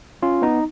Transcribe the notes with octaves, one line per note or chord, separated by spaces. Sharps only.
C#4 F4
B3 D#4